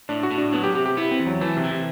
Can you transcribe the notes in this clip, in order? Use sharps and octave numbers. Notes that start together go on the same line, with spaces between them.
A2 D4
F#4
A2
D4
F#3 B3
G4
C3 G4
G4
B3 E4
C4
E2
F#3
E3 A3
C3
E3
C3